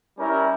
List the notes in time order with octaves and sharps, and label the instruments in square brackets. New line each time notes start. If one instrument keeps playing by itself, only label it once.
[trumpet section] G3 C#4 E4 A#4